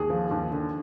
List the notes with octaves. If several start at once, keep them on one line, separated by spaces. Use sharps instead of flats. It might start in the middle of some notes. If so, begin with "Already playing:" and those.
Already playing: D#2 G#4
F3
D#2
D3